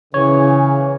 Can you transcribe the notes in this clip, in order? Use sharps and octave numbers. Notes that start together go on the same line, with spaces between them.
C#3 E3 C#5